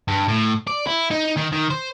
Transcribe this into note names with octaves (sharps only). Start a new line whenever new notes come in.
G2
A2
D5
E4
D#4
D#3
D#3
C5